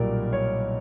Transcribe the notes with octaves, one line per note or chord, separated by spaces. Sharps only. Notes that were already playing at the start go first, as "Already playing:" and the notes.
Already playing: B1 A#2 G3 A#4 D5
C#5